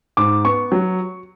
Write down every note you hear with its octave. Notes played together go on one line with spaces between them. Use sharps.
G#2 D6
B3 C#6
F#3